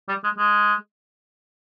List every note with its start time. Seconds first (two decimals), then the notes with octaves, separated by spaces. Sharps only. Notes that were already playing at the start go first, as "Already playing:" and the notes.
0.09 G3
0.24 G#3
0.38 G#3